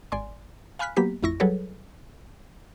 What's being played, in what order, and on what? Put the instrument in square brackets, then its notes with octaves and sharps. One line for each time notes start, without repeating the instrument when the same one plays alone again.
[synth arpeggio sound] G#1 D5 G#5 C6
F5 G#5 B5 F6 F#6 B6
F#3 A#3 B3 G4 B6
A1 F2 E4 C#6 A#6
F#3 G3 G#4 A4 B4 C#5